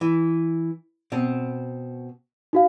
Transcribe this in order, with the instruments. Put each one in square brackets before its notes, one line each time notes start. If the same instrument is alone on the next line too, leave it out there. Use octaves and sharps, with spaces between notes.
[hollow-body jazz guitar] E3
B2 C4
[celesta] D#4 F#4 F5